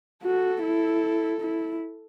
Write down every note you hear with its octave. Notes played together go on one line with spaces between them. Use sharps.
F#4 A4
E4
E4